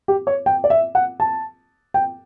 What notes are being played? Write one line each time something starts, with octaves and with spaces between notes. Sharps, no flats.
G4
C#5
G5
D5
E5
F#5
A5
G5